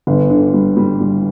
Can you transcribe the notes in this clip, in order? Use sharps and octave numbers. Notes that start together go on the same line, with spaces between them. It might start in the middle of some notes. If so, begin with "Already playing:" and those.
G1
D3
G3
G3
G3